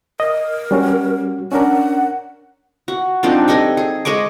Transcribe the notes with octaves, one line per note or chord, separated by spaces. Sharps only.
A#4 D#5
G3 C#4 F#4
C#4 D4 A#4 F#5
F#4
F3 C4 D4 D#4
G3 A4 D#5 G#5
G#4
G#3 D#5 C#6 D6